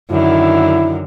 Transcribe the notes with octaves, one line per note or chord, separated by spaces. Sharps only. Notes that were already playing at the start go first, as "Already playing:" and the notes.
F#2 D3 D#3 E4